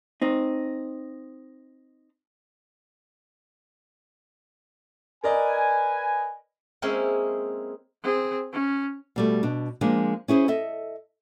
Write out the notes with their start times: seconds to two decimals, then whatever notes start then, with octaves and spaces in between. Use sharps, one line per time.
0.22 C4 D#4
5.24 A#4 B4 D5 D#5 G#5
6.82 G#3 A#3 C4 C#4 E4 G#4
8.03 C4 G#4
8.53 C#4
9.16 B2 G3 A3
9.43 B2 D4
9.81 F3 G#3 A#3 D4
10.28 C#4 E4 G#4 C5
10.48 A4 D#5 E5